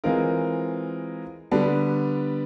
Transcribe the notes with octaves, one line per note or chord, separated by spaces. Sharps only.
E3 G#3 C4 F4 A#4
D3 G3 B3 D4